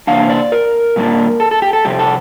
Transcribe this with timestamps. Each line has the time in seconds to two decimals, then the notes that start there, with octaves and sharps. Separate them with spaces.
0.07 C3 E3 A#3 D4 F5
0.30 D5
0.52 A#4
0.96 A#2 G3 A#3 D4
1.40 A4
1.51 A4
1.62 G4
1.73 A4
1.85 F2 C3 G3 G4
1.99 A4